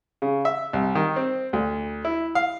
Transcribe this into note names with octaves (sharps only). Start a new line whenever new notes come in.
C#3
E5
C2
D#3
C4
D2
E4
F5